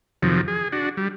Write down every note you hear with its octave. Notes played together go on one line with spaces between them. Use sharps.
F2 C3 D#3 F3 F#3
G#4
D4 F#4
G3